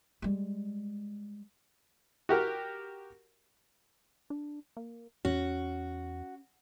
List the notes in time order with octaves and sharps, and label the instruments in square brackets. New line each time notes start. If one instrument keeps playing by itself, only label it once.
[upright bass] G3 G#3
[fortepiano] F#4 G4 A#4
[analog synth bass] D4
A#3
[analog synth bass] E2 [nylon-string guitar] C#4 [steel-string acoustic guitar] F#4